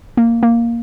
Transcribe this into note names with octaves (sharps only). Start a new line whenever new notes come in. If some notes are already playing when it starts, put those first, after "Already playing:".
A#3
A#3